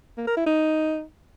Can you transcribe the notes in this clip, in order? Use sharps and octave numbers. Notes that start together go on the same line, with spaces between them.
A#3
A#4
E4
D#4